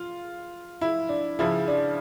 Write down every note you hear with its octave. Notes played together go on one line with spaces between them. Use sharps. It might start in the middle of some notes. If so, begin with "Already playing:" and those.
Already playing: F4
E4
D4
C#3 F3 E4
D4